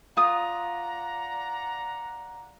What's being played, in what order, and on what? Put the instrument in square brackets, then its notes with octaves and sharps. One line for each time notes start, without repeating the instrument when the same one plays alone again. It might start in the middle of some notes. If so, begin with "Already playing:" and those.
[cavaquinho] F4 D#6 [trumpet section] D5 F#5 A#5